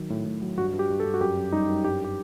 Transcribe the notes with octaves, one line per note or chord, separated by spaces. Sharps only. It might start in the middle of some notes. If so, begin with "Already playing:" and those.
Already playing: D#3 F#3
A2
A2
F#3
G2 F#4
G2
G4
G2
A4
G2
F#4
F#2 G4
F#2
G3 D#4
F#2
G2 G4
G4